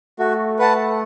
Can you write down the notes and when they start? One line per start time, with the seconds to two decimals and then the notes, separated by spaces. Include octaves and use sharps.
0.19 A3 F#4
0.59 B4 F#5 A5